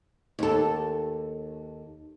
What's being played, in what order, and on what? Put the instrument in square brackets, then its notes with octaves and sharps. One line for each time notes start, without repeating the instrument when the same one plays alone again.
[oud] D#2 A4